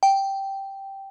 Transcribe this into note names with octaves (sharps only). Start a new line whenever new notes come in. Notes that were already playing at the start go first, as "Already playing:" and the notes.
G5